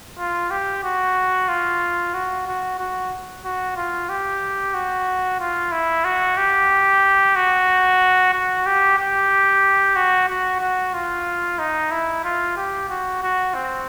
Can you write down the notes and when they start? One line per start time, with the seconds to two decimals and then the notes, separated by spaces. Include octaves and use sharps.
0.19 F4
0.51 G4
0.84 F#4
1.48 F4
2.14 F#4
2.47 F#4
2.79 F#4
3.45 F#4
3.76 F4
4.09 G4
4.74 F#4
5.40 F4
5.72 E4
6.05 F#4
6.37 G4
7.36 F#4
8.34 F#4
8.66 G4
8.98 G4
9.96 F#4
10.28 F#4
10.61 F#4
10.94 F4
11.59 D#4
11.91 E4
12.24 F4
12.57 G4
12.89 F#4
13.22 F#4
13.54 C4